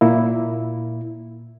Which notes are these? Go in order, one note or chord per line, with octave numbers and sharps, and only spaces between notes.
A#2 A#3 E4